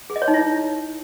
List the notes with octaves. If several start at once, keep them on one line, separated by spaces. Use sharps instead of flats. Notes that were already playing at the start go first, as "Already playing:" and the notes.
G#4
D#5
C#5
D#4
E4